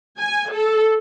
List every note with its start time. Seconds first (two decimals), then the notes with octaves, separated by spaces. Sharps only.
0.19 G#5
0.52 A4